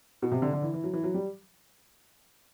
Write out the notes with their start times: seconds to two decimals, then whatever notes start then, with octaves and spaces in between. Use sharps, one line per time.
0.22 B2
0.32 C3
0.42 D3
0.53 D3
0.62 E3
0.74 E3
0.84 F#3
0.93 E3
1.04 F#3
1.14 G3